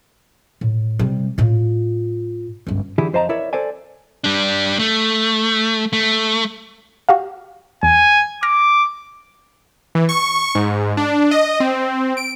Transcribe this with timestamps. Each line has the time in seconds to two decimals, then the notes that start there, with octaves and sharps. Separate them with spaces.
0.61 A2
0.99 C3 G3
1.38 A2 F4
2.67 G1 C#2
2.98 D3 E3 E4 G4 G#4
3.13 F2 C5 D#5 A5 A#5
3.29 E4 A#4 C#5 D5 E5
3.53 A4 C5 D5 G#5
4.24 G3 D4
4.79 A3
5.93 A3
7.09 F#4 G4 F5
7.83 E2 G#5
8.43 D6 F6 A#6
9.95 E3
10.09 C#6
10.55 G#2
10.97 D4
11.31 D#5
11.60 C4
12.17 D7